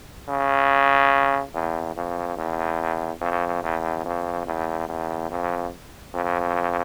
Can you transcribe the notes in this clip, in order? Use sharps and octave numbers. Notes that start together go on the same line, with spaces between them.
C#3
E2
F2
E2
F2
E2
F2
E2
E2
F2
F2